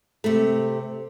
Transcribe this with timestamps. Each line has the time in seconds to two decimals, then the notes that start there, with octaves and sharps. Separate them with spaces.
0.24 C3 A3